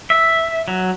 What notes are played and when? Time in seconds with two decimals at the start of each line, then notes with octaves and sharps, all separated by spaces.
0.10 E5
0.68 F#3